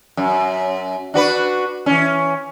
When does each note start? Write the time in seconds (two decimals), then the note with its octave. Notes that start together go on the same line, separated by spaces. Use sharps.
0.17 F#2
1.14 D4 F#4 B4
1.86 E3 C#4